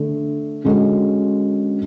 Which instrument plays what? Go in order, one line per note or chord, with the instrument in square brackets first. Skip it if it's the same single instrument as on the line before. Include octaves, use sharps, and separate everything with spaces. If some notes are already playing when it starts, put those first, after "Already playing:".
Already playing: [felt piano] D3 A3 D4 A4
D3 G#3 C#4 F#4 A4